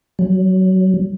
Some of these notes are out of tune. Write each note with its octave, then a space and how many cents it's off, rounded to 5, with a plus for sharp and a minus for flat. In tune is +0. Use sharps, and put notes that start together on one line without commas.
F#3 +20